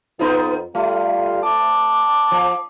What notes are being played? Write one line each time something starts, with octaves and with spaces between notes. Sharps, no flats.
F2 B3 D#4 F4
G3 A3 F4
C4 A5 D6
F3